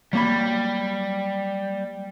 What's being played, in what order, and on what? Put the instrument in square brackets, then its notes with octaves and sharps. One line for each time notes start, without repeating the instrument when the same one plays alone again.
[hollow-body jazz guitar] F#3 A#3 B5 [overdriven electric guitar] G3